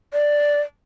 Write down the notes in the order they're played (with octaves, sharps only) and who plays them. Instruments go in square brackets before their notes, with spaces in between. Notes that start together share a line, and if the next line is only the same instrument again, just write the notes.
[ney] D5